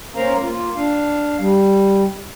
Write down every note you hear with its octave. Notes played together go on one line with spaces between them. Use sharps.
A#3 C#4 A#4 C5 F5 A#5
A#3 F4
D4 F5
G3